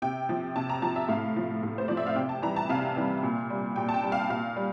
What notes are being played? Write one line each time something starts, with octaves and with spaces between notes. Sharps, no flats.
C3 G5
F3
C3 A5
A#5
F3 A5
E5
A2 F5
F3
A2
C5
F3 D5
E5
F5
C3 G5
A5
E3 G3 A#5
A5
C3 F5
E3 G3
A#2
G3
A#2 G5
A5
G5
G3
F5
A#2 F5
G3